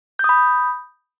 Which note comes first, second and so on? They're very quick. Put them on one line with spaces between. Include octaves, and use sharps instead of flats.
G6 D#6 B5